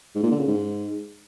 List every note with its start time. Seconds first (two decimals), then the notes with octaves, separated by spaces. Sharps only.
0.15 G#2
0.23 A#2
0.31 D3
0.39 C#3
0.48 G#2